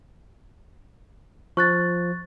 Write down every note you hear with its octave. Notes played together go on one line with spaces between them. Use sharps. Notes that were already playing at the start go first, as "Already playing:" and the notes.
F3 C#6 F#6 A6